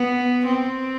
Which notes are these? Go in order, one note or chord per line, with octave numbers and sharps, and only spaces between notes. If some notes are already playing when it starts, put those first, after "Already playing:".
Already playing: B3
C4